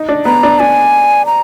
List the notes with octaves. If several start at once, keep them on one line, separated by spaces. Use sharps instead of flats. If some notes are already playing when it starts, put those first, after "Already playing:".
Already playing: D#4
D4
B3 A#5
D4
D4 G#5
A#5